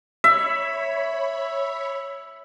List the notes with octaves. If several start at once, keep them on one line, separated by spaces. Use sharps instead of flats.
C#5 E5 B5